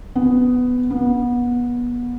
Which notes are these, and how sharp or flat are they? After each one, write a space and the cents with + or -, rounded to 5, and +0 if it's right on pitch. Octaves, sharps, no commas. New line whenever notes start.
B3 +10
B3 -25